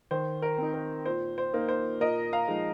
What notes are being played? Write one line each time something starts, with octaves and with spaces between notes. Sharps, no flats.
D#3 C5
A#4
C4 D#4
A#4
A#2 C5
C5
A#3 D#4
C5
A#2 A#4 D#5
F5 A#5
F3 G#3 D#4